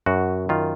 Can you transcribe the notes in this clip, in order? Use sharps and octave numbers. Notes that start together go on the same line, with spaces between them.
F#2 F#4
D#3 F4